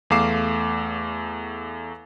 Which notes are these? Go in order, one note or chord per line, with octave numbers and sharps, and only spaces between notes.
E2 A3 F5 D6 C7 E7